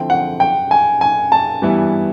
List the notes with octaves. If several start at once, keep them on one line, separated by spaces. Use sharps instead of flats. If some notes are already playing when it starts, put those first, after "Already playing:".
Already playing: D3 F3 A3 C4 E4 G5
F#5
G5
G#5
G#5
A5
G2 E3 G3 B3 E4